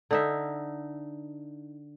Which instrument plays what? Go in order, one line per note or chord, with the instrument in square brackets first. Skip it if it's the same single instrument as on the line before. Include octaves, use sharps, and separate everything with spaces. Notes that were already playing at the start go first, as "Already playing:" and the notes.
[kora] D3 D#4 E5